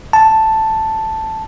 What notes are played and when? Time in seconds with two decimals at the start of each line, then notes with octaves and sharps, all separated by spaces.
0.13 A5